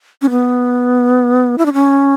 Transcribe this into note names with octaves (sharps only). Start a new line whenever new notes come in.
C#4
B3
E4
D4
C#4